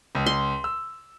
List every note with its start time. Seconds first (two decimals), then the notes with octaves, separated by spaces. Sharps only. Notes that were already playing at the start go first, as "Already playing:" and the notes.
0.15 C#2
0.26 C6
0.64 E6